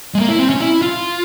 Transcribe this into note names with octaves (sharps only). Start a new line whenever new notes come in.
G#3
A#3
E4
C4
C#4
E4
F4